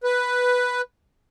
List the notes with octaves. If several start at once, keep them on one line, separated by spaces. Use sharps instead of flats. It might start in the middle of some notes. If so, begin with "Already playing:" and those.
B4